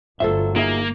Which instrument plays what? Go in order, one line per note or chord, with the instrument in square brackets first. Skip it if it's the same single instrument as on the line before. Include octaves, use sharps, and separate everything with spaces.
[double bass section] G1 [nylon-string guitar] F#3 A3 F4 [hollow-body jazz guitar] A4 C5 E5
[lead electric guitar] A#3 [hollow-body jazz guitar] D#4 G#4 E5